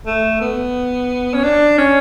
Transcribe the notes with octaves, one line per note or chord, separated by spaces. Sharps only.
A3
B3
C#4
D4
C#4